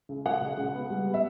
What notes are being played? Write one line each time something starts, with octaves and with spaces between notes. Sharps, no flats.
C#2
F#3 F#5
C#3
C#2
B3
G3
B3
E5